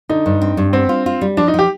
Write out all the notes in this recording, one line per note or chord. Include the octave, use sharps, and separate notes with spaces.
D3 D#4
G2
C4
G2
B3 C4
F4
F4
G3
F3 D4
D#4
F3 G4